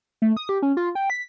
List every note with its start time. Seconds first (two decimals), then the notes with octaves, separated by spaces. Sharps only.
0.22 A3
0.37 D#6
0.49 G4
0.62 C#4
0.77 F4
0.95 G5
1.10 B6